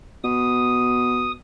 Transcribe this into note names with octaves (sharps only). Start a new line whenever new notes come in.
B2 D#6